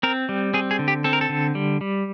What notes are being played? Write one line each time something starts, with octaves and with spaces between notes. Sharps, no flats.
C4 A#4
G3
C4 G#4
G#4
D3
G4
C4 A4
A#4
A4
D3
G3
G3